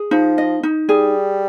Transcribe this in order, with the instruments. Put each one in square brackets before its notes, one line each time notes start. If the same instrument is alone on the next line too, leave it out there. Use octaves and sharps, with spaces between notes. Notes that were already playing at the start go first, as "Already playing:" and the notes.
Already playing: [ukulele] G#4
[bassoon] F3 [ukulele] D#4
[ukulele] D#5
D#4
[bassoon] G3 [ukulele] G#4